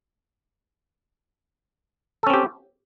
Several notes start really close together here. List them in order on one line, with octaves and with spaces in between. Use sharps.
A4 C#4 C4 G4